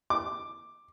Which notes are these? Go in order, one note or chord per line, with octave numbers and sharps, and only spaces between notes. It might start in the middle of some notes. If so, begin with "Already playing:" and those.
D6